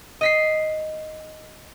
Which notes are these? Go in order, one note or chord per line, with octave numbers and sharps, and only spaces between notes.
D#5 B6 C7